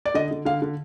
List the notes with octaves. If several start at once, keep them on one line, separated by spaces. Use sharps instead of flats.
D5
D3 D#5
D3
D3 F5
D3